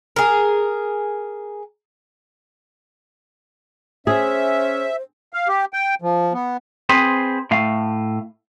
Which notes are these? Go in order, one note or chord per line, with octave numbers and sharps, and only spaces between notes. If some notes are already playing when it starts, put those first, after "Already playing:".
G#4 A#4
C#4 G#4 C5 E5
F5
G4
G5
F3
B3
C4 G#4 B4 C5
A2 A3 F5